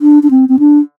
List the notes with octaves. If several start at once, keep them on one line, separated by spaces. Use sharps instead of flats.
D4
D4
C4
C4
D4